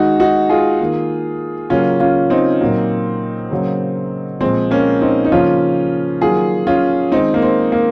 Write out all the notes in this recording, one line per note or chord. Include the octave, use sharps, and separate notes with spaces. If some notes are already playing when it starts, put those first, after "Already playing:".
Already playing: D#3 G#3 D#4 F#4
D#4 F#4
F4 G#4
D#3 A#3
C#3 F#3 A#3 C#4 F4
C#4 F4
C4 D#4
A#2 F#3 A#3
C#3 F#3 A#3
A#2 F3 G#3 C4
A#3 C#4
C4 D#4
D#4
C#3 F3 A#3 C#4 F4
D#3 F#3 A#3 F4 G#4
C#4 F4
D#3 G#3 C4 D#4
A#3
C4
A#3